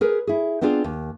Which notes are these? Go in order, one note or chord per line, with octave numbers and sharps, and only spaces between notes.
G#4 A#4 B4
E4 G#4
B3 C4 D4 F4 G#4
D#2